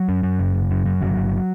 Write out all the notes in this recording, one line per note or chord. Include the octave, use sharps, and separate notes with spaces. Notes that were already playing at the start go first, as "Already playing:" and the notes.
Already playing: F#3
F#2
F#2
F#1
F#1
F#2
F#2
G1 F#3
G1